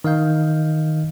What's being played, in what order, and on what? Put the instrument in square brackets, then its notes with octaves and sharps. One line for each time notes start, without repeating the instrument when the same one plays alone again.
[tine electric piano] D#3 D#5 F5 G6